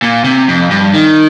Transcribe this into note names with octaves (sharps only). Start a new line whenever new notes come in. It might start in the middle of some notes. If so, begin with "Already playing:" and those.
A#2
C3
F2
G2
D#3